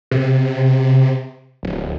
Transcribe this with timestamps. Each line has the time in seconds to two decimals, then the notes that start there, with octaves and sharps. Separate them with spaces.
0.11 C3
1.63 D1